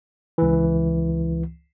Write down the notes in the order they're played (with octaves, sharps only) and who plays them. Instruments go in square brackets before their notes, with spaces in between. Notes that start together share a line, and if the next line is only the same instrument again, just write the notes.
[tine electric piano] C#2 E3